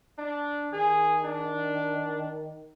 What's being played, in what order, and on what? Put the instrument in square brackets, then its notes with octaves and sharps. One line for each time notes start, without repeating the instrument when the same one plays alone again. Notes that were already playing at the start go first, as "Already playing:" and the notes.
[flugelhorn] D4
[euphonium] D#3 [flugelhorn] G#4
[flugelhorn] D4